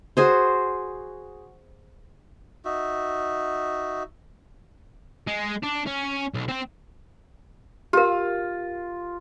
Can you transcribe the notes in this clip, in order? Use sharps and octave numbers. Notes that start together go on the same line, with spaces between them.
F#4 G#4 C5
D#4 F#4 E5
G#3
D4
C#4
B1
C4 G5
F4 G4 A#4